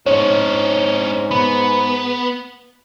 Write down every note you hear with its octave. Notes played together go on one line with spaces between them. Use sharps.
G#2 C#4 D4 C#5
B3 B5